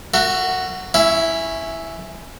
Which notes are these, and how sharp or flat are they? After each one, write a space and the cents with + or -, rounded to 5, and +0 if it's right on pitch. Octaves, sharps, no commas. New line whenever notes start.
F#4 +0 A#4 -35 E5 +35
C#4 +0 E4 +0 E5 +40